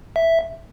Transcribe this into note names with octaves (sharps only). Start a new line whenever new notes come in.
E5